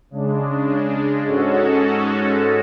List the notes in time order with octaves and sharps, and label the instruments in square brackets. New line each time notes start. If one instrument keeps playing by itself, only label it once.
[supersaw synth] C#3 G#3 D4
G#2 G#3 C#4 F#4 A4